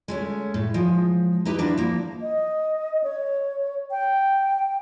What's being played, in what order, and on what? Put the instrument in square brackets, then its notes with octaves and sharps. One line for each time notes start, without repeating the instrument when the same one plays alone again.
[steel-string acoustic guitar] G#3 A3 C#4
A2
F3 G#3
D#4 E4 G4 B4
F3 G3 D4 E4 F#4
F3 A#3
[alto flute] D#5
C#5
G5